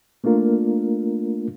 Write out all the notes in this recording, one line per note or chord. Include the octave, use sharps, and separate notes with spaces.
A3 A#3 D4 F4 A#4